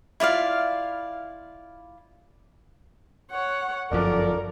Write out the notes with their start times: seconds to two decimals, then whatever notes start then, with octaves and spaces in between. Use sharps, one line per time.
0.20 E4 F4 D5 F5
3.31 C#5 F#5
3.92 G1 F#2 F3 A4 A#4 D5